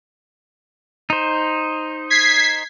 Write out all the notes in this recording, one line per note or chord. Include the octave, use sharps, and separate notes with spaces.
D#4 C5
G#6 B6 C7